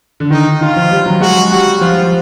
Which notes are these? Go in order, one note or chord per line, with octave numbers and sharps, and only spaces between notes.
D3
D#3 D#4
D#3 F4
F3
G3
F#3
G#3 F#4
G3 F#4
F3 F4